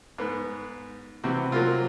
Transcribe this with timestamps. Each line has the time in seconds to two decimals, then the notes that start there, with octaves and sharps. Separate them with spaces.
0.18 G#2 B3
1.24 C3 E3 C4 F#4
1.52 F#3 A#3 F4